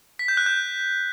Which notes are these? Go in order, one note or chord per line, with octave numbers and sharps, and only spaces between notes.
B6
G6
F#6
G6